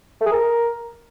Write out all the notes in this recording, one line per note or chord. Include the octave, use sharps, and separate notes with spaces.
A3
G#4
A#4